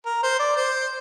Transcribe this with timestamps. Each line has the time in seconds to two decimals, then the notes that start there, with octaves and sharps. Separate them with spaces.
0.05 A#4
0.23 C5
0.39 D5
0.56 C5